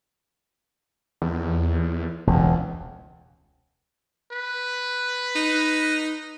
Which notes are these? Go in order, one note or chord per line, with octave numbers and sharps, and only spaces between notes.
E2
E1 C#2
B4
D#4